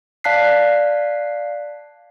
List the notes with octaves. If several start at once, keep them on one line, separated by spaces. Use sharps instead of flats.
D5 F5 A5 F#6 B6 C7